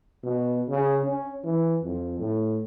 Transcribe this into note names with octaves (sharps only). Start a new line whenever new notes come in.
B2
C#3
C#4
E3
F2
A2